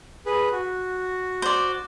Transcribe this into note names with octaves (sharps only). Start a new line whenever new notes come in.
G#4 B4
F#4
C5 D5